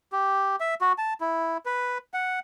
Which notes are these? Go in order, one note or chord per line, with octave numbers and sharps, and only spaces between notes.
G4
E5
F#4
A5
E4
B4
F#5